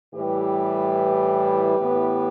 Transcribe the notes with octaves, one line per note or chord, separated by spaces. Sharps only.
A2 E3 G3 G4 B4
A2 E3 B3